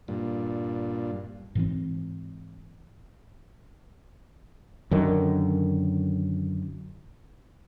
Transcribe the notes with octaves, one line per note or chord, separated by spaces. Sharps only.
G2 A#2
G#2 E3 C4
F#2 D3 D#3